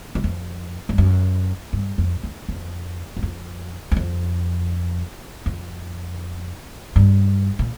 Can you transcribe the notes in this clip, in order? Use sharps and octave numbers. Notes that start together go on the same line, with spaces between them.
F#2
F2
G2
F#2
G2
F2
E2
F2
F#2
F2
E2
F2
F2
G2
A#2